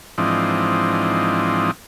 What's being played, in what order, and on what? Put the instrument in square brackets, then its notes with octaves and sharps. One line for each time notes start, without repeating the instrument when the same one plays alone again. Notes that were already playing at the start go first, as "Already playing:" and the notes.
[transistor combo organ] G#2 E3 F3 C4 D4 D#4